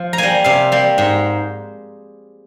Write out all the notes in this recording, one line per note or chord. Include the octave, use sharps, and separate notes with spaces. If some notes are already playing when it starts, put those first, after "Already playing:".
Already playing: F3
A#5
G3 A#3 G#5
C3 F5
G3 A#3
G#2